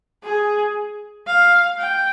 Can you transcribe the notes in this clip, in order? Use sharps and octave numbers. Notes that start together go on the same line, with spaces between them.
G#4
F5
G5